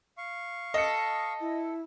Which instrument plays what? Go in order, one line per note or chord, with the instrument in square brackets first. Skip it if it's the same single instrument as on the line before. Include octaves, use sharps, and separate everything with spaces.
[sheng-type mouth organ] F5 C#6
[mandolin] A4 [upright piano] D#5 C#7
[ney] E4